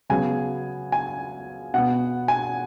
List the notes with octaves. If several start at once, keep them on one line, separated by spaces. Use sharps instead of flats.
C#3 F#3 B3 G#5
G#5
B2 B3 F#5
G#5